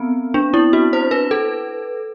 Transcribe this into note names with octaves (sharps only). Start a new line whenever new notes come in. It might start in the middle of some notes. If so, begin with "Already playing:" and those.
Already playing: B3 C4
D4
E4
F#4
C5
B4
A4